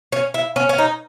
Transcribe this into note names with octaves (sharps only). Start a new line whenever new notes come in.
C#4
E4
C#4
C#4
D#4